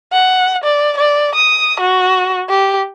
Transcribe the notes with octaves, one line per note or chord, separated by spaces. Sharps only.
F#5
D5
D5
D#6
F#4
G4